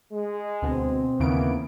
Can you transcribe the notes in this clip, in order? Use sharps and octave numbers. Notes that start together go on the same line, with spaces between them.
G#3
D2 B2 C4
D#2 C#3 E3 A#3 B3 D7